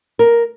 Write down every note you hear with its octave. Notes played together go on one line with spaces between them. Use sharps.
A#4